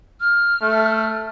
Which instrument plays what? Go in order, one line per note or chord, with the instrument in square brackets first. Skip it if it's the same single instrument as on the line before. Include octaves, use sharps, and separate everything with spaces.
[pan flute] F6
[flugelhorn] A3